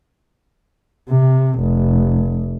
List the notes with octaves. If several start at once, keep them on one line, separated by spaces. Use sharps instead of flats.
C3
F1